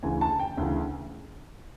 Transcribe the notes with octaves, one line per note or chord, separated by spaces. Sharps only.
D2 C#3 E3 G#5
A5
G5
D2 C#3 E3